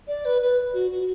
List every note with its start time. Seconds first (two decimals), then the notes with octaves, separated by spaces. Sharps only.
0.08 D5
0.25 B4
0.42 B4
0.74 F#4
0.91 F#4